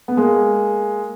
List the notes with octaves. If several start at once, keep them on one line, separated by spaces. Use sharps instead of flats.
B3
G#3 A#3